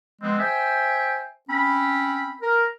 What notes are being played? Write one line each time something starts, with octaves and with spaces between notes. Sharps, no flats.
F3 G#3 B3 C4
C5 E5 G5 G#5
C4 C#4 B5
A#4